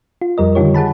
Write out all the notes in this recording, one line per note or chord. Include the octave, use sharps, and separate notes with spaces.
F4
F2 G3 A#4 D#5
D3 D#3 G3 F4 G4 C#5
G#4 F#5 A5 B5